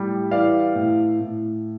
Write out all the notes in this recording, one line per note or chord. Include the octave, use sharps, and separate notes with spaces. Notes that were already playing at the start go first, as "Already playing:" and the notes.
Already playing: A2 G3
E3 D5 F5
A2
A2